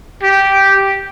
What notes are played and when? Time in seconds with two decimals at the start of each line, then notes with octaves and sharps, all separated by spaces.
0.23 G4